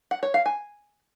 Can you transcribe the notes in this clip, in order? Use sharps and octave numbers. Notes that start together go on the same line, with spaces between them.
F#5
C#5
F5
G#5